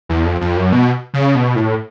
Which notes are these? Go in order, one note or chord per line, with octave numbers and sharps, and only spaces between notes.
E2
F2
F2
F#2
B2
C#3
B2
A2